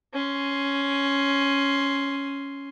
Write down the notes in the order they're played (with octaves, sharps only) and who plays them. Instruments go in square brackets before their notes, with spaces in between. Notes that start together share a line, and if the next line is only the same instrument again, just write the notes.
[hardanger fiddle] C#4 C6